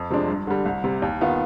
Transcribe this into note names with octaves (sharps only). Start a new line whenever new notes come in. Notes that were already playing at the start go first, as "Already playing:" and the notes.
Already playing: F2
C3 F3 G#3 D4
G2
D3 G3
C2
C3 G3
D#2
D#3 B3 F4